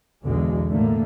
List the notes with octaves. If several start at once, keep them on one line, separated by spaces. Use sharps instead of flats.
B1 E2 B2 D3 G#3
A2 D3 A3 A#3